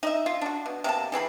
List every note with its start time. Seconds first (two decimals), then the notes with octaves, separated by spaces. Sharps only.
0.03 D#4 D#5 E5
0.26 F4
0.41 D4 F#4
0.66 B2
0.84 C3 A#3 B3 A5
1.12 E3 C4 G#4 B5